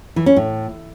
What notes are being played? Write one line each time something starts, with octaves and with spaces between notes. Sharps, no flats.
E3
C#4
A2